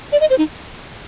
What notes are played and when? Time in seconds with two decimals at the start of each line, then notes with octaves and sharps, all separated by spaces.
0.12 D5
0.21 D#5
0.30 C5
0.38 D#4